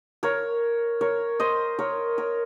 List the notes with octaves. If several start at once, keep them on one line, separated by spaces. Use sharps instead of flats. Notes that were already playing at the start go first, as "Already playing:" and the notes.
A#4 C#5
A#4 C#5
C5 D#5
A#4 C#5
A#4 C#5